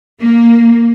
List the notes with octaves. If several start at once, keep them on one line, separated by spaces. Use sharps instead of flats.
A#3